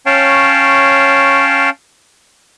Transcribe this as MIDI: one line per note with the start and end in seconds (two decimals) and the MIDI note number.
0.06 1.70 61
0.06 1.70 73
0.06 1.70 77
0.06 1.70 79
0.06 1.70 81